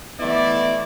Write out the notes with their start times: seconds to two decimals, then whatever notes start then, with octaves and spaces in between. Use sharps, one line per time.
0.20 E3 A3 B3 E4 D5 D#5